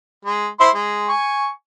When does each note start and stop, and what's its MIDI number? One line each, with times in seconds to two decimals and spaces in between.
0.25 0.47 56
0.60 0.70 64
0.60 0.70 72
0.60 0.70 84
0.75 1.09 56
1.09 1.50 80
1.09 1.50 85